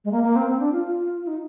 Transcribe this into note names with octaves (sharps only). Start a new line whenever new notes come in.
G#3
A#3
A#3
C4
C4
D4
F4
F4
F4
D#4